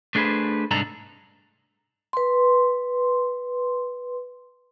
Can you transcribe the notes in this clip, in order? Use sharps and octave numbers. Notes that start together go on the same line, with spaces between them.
A3 D4 G#4 A4 B4 C5
C2 G#2 D4 D#4 A4 A#5
B4 C6